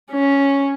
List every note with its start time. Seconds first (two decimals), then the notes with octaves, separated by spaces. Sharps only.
0.11 C#4